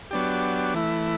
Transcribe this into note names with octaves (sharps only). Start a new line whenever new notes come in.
F#3 B3 D4 G4
E3 A3 E4